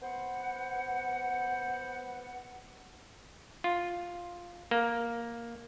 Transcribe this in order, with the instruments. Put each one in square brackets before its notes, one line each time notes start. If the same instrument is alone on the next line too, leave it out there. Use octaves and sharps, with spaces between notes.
[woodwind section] B3 C5 F#5
[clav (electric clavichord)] F4
A#3